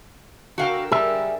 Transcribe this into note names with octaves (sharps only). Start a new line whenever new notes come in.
D3 F#4 A#4 F5 G5 E6
G3 G#4 E5